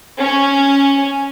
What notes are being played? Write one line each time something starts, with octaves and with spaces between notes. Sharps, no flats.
C#4